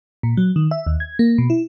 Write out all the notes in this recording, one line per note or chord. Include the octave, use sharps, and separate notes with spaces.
A#2
F#3
D#3
E5
D#2
G#6
A#3
B2
E4